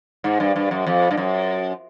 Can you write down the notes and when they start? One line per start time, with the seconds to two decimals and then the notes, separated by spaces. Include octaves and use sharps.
0.24 G#2
0.40 G2
0.56 G2
0.71 F#2
0.87 F2
1.11 G2
1.17 F#2